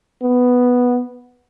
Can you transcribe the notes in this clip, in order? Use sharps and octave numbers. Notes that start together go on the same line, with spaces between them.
B3